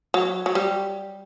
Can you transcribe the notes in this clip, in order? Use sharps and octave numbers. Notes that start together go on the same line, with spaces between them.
F#3
F#3
G3